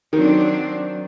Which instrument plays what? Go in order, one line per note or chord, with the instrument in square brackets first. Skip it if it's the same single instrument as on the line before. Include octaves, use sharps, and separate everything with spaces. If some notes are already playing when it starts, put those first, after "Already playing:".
[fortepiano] D#3 [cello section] F#3 C4 D4